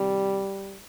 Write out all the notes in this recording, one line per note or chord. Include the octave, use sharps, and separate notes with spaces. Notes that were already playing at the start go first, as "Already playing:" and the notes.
Already playing: C3 D#3 G3